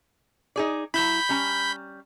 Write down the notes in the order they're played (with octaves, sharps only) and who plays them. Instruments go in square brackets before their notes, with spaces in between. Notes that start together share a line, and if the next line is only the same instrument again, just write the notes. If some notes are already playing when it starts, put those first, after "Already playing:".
[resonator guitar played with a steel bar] D#4 G#4 D5
[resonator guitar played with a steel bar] F#3 E4 [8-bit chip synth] B5 G6 B6
[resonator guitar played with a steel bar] G3 C#4 A#5